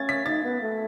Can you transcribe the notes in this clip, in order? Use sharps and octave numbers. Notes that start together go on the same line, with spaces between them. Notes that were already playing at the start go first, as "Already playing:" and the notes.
Already playing: C#4 G#6 A6
B6
D#4 A6
B3
A3